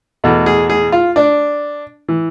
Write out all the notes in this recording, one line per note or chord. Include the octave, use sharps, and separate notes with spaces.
E2 B2 A3
G#4
G#4
F4
D4
E3